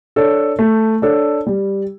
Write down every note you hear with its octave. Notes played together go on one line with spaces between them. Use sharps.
D4 A4 C#5
A3
D4 A4 C#5
G3